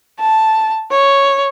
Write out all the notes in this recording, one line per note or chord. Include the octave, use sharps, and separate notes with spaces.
A5
C#5